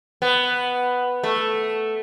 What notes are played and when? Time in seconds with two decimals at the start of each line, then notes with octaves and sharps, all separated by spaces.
0.22 B3
1.23 A3